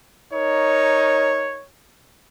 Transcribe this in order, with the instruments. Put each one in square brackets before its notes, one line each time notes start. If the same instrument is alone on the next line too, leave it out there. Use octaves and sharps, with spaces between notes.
[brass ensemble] D#4 A#4 C#5